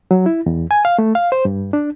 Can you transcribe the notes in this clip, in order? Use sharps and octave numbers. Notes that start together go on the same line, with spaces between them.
F#3
E4
E2
G#5
F5
A3
F5
C5
G2
D4